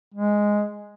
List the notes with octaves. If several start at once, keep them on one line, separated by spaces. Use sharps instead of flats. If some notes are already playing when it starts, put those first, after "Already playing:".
G#3